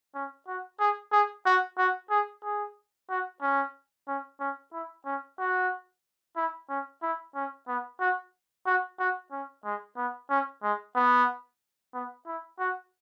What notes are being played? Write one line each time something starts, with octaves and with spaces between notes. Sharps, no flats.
C#4
F#4
G#4
G#4
F#4
F#4
G#4
G#4
F#4
C#4
C#4
C#4
E4
C#4
F#4
E4
C#4
E4
C#4
B3
F#4
F#4
F#4
C#4
G#3
B3
C#4
G#3
B3
B3
E4
F#4